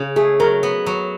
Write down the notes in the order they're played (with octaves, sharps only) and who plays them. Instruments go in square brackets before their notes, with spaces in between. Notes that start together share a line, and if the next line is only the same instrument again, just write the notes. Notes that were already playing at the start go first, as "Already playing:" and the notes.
Already playing: [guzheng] C#3
[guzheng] A3 [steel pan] G#4
[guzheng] F#3 [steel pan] A#4
[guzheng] B3
F#3